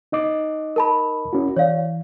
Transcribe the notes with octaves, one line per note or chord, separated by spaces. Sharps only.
D#4 D#5 D6
A#4 A5 B5
C#4 E4 F#4
E3 C#5 D5 F5